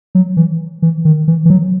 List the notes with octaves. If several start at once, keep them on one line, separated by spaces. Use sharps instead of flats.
F#3
E3
E3
D#3
E3
E3
F#3